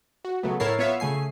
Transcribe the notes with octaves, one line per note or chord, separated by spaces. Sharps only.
F#4
C#3 F#3 A3 B3
A2 E4 A#4 C#5 A5 C7
B3 F4 C#5 E5 F5
C#3 A3 G#5 C7